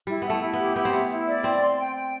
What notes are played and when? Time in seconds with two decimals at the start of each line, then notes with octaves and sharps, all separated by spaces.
0.07 G3 E4
0.22 B3 E4
0.30 A3
0.41 E4
0.53 B3
0.59 G4
0.76 B3 E4
0.85 C4
0.93 B3 E4
1.10 E4
1.27 D5
1.44 C4 G5
1.61 C6
1.79 G5
1.95 G5